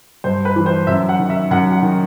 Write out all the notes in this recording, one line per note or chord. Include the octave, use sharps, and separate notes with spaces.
G2 C5
B4
E3
C5
F#2 E5
F#5
D#3
E5
F#2 F#5
F#5
D#3